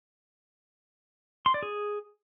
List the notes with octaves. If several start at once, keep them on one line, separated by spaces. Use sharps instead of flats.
C6
D5
G#4